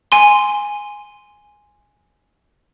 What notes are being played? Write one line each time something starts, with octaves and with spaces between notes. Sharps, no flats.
G#5 C6